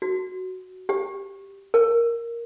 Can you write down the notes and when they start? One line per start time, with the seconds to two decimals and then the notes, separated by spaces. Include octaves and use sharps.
0.02 F#4
0.89 G4
1.74 A#4